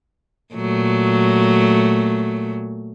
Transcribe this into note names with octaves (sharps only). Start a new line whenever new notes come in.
A#2 F#3 A3